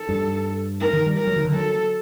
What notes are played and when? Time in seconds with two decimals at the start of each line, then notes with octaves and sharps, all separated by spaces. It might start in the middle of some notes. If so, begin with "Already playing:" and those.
Already playing: A4
0.09 G2
0.81 A#4
0.93 D#3
1.06 G3
1.18 A#4
1.27 F#3
1.36 D#3
1.45 D3
1.54 F#3 A4